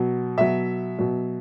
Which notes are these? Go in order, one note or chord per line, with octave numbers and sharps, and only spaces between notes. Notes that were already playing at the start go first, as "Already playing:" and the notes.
Already playing: B2 F#3
B2 F#3 E5
B2 F#3